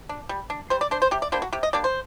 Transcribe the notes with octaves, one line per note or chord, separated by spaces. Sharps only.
D4
G3
D4
G3 C5
D5
D4 C5
C5
C3 G4
D5
G3 A#3 D4 C5
F#4
C3 G4
D#5
G3 A#3 D4 D5
C5